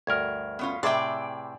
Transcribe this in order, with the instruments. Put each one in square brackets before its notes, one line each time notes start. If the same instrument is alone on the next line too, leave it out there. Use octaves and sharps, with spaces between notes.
[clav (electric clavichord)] D2 G2 A#4 [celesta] F6 G#6
[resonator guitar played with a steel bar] B3 C#4 F4
[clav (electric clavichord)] A2 C3 [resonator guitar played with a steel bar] G#4 B4 E5 [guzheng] D5 G5